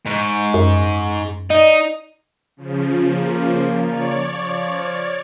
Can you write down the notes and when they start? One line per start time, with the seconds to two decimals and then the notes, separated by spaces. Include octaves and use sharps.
0.06 G#2 G#3 C#6
0.54 F#2
1.50 D#4 D5 D#5 D#6
2.57 C#3 F3
3.08 A#3 F4
3.84 C#5 D5
4.32 F3